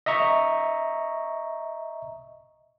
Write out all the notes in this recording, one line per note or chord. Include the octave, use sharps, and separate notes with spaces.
D#5 E5 A#5 C#6